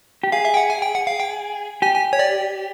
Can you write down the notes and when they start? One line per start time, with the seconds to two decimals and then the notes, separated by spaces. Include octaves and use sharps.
0.23 G4
0.32 G#4 F5
0.45 E5
0.54 G5
0.57 F#5
0.70 G#5
0.82 G5
0.95 F#5
1.07 F5
1.20 G5
1.82 G4 G#5
1.94 G#5
2.13 C#5
2.19 D5